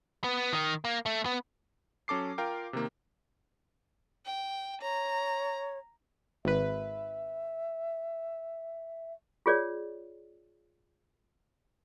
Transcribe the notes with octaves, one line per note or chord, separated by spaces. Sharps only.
B3
D#3
A#3
A3
B3
F#3 C#4 A4 D6 C7
F4 A#4 F5 G5
C3 D#3 A#3
G5
C#5 A#5
G#1 B4 E5
F4 G#4 C#5 D5